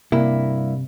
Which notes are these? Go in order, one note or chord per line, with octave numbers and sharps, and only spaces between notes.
G2 C3 A#3 E4